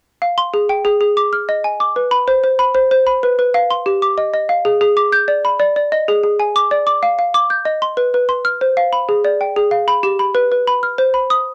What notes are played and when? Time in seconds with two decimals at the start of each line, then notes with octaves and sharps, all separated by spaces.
0.22 F5
0.38 C6
0.54 G#4
0.69 G5
0.85 G#4
1.01 G#4
1.17 D6
1.33 F6
1.49 D#5
1.64 G#5
1.80 D6
1.96 B4
2.11 B5
2.28 C5
2.44 C5
2.59 B5
2.75 C5
2.91 C5
3.07 B5
3.23 B4
3.39 B4
3.54 F5
3.71 C6
3.86 G4
4.02 D6
4.18 D#5
4.34 D#5
4.49 F5
4.65 G#4
4.81 G#4
4.97 D6
5.12 G6
5.28 D5
5.45 B5
5.60 D5
5.76 D5
5.92 D#5
6.08 G#4
6.24 G#4
6.40 G#5
6.56 D6
6.71 D5
6.87 D6
7.03 F5
7.19 F5
7.34 D6
7.50 G6
7.65 D#5
7.82 C6
7.97 B4
8.14 B4
8.29 C6
8.45 F6
8.61 C5
8.77 F5
8.93 B5
9.09 G#4
9.24 D5
9.41 G5
9.56 G#4
9.71 F5
9.88 B5
10.03 G4
10.19 B5
10.35 B4
10.52 B4
10.67 B5
10.83 F6
10.98 C5
11.14 B5
11.30 D#6